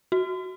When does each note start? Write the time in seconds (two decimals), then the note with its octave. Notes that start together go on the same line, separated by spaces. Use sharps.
0.12 F#4